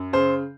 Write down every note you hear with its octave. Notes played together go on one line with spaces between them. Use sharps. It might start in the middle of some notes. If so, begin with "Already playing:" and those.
Already playing: F#2
C#3 C5